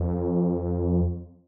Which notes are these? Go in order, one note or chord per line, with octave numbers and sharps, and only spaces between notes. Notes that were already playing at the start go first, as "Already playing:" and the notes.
Already playing: F2